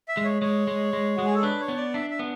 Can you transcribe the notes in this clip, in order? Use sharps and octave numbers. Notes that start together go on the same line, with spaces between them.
E5
G#3
C#5
G#3 C#5
G#3
G#3
G#3 F#4
G#4
A4
D4 B4
C#5
B3
D5
D4 E5
E5
B3